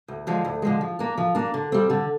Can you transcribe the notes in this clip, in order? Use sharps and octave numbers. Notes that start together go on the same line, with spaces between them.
D2
D3 F3 G#3
D2
D3 F3 G#3
F3
A#3 D4
F3
A#3 D4
D3
G3 C4
D3